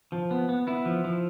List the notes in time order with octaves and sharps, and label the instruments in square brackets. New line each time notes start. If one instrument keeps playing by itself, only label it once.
[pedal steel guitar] F3
B3
B3
B3 E4
F3
F3